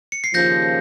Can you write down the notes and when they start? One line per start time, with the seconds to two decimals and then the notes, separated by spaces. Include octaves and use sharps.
0.12 C#7
0.24 C7
0.34 D#2 C#3 F3 G6 A#6